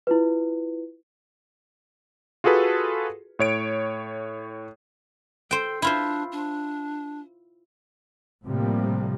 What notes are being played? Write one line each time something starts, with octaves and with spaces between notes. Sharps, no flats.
E4 F4 B4
F4 F#4 G#4 A4 B4
A2 C#5 D7
A4 C5 G5
D4 E4 F4 C5
D4
A2 C3 F3 G3 A#3